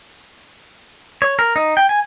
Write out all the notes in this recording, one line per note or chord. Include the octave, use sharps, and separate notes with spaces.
C#5
A#4
D#4
G5
G#5